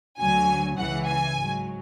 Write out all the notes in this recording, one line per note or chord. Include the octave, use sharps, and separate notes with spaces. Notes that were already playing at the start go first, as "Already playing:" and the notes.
D2 D3 F#3 G#5
C#2 C#3 E3 F#5
G#5
G#2 F#3